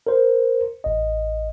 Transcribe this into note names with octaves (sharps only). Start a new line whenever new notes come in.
A#4 C5
A1 D#5